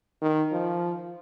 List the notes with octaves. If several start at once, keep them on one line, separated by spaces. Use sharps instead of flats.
D#3
F3